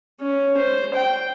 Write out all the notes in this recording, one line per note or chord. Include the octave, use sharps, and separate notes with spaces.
C#4
C5
G5